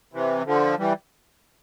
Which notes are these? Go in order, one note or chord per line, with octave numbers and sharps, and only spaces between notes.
C3 E3
D3 F3
E3 G3